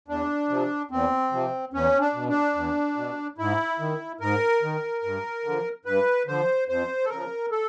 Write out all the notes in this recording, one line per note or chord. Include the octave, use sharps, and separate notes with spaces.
E2 D4
C3 F3
E2 C4
C3 F3
E2 C#4
D4
B2
D4
E2
B2
G#2 E4
D#3
G#2 A#4
D#3
G2
D3
F3
G2 B4
D3 F3 C5
F2 C5
A4
C#3 F3 A#4
A4